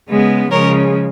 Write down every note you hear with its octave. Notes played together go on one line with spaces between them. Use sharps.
C#3 G#3 B3
C#3 F3 G#3 A#4 C#5